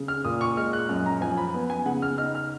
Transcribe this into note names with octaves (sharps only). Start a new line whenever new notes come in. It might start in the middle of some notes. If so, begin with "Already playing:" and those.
Already playing: C#3
F6
A#2 D#6
C#6
G#3 F6
F#6
F#2
A#5
F3 G#5
B5
B3
G#5
C#3 F#5
F6
D#4 F6
F6